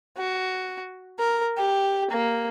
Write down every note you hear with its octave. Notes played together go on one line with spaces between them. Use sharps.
F#4
A#4
G4
A#3